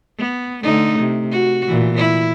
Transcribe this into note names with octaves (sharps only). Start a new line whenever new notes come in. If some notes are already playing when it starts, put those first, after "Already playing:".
B3
D3 A3 D#4
C3
F#4
A#2 E3
E4